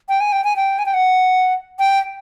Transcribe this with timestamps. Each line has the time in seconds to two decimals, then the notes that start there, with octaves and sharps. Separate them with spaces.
0.09 G5
0.21 G#5
0.32 G5
0.44 G#5
0.56 G5
0.79 G#5
0.86 G5
0.94 F#5
1.79 G5